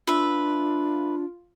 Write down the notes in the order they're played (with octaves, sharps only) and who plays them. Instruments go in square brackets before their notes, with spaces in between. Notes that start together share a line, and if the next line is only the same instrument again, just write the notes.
[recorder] D4 [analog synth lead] F4 [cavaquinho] B4 E5